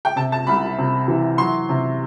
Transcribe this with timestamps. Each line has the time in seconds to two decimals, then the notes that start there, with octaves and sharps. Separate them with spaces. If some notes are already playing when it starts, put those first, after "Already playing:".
0.05 G5
0.16 C3 A5
0.32 A5
0.47 C2 B5
0.78 C3
1.08 E3
1.38 F#3 C6
1.69 C3